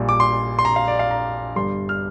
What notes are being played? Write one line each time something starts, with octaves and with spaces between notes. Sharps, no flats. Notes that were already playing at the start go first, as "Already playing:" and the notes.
Already playing: A#1 A#2 G3
D6
C6
C6
A#5
F5
D5
F5
A#5
G1 G2 G3 C6
F6